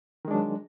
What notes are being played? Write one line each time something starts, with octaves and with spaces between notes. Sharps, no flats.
D#3 F#3 G#3 D4